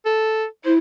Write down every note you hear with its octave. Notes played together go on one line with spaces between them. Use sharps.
A4
E4 C5